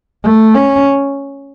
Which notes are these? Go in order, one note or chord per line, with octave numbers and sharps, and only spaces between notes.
A3
C#4